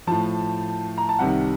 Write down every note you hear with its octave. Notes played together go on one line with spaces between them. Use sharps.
A2 F3 A5
A#5
A5
C2 C3 D#3 F#5